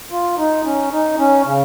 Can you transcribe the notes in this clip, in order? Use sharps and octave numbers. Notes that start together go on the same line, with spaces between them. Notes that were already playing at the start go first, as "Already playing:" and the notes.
F4
D#4
C#4
D#4
C#4
C#3